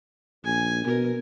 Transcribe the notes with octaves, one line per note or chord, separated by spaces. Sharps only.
A#1 G#5
B2 A#4